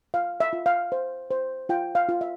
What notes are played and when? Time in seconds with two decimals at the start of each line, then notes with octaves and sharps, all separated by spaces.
0.14 F4 F5
0.40 E5
0.53 F4
0.66 F5
0.92 C5
1.31 C5
1.69 F4 G5
1.95 F5
2.09 F4
2.21 E5